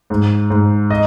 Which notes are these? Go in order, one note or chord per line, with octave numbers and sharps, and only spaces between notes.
G#2
G#2
D#5